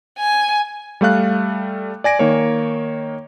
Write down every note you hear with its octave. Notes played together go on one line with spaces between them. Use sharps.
G#5
G3 A3 F5 F#6
D5 G#5 A#6 D7
D#3 A#3 C#5